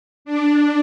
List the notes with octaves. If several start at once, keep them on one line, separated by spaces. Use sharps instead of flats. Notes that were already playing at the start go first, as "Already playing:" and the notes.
D4